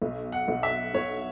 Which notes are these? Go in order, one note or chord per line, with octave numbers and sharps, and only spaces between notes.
B1
F#5
B1
E5
B1 C#5